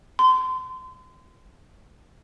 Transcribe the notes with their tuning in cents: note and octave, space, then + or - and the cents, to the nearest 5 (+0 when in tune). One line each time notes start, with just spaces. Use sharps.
C6 -30